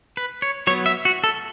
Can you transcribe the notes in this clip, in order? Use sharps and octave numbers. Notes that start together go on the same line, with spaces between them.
B4
C#5
F#3 B3 C#5
E5
F#4
A4